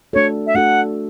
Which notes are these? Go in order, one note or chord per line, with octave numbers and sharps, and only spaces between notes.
A3 D4 F#4 A4 C#5
E5
A3 D4 F#4 A4 F#5